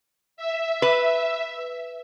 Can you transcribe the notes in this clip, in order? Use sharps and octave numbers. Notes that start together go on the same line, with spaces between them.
E5
B4